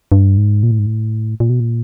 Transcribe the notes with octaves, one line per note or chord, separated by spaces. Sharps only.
G2
G#2
A#2
A2
G#2
A2
A#2
B2
A#2